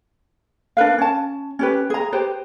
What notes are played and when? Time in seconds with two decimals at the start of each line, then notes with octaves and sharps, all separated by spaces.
0.77 D4 A#4 B4 F5
0.98 C#4 A5
1.59 C#4 G4 B4
1.90 G#4 A#5
2.12 G4 B4 C5